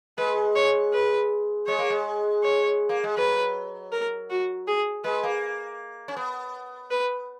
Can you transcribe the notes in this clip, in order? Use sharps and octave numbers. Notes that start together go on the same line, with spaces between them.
G#3 B4
C#5
B4
G#3 C#5
A#3
G#3
C#5
A#3
G#3
F#3 B4
A#4
F#4
G#4
G#3 B4
A#3
C#4
B3
B4